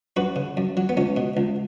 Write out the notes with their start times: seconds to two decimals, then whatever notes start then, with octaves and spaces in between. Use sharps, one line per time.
0.16 F#2 F#4 B4
0.36 C#3
0.57 F#2
0.77 F#3
0.89 B3
0.97 C#2 C#4
1.16 B2
1.37 C#2